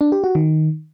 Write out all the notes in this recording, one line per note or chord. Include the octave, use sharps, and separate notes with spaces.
D4
G4
F#4
D#3